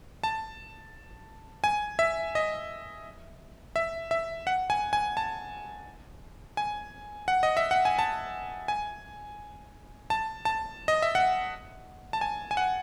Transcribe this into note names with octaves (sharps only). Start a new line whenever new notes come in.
A5
G#5
E5
D#5
E5
E5
F#5
G#5
G#5
A5
G#5
F#5
D#5
E5
F#5
G#5
A5
G#5
A5
A5
D#5
E5
F#5
A5
G#5
G#5
F#5